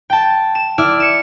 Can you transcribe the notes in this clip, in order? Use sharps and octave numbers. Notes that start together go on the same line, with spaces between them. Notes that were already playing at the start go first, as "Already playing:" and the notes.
G5 A5
E7
E4 D5 F6
C#7 E7